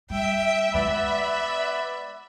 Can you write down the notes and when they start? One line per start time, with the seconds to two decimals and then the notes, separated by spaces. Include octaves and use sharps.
0.10 G3 E5 G5
0.74 G#3 B3 F4 B4 D5 B5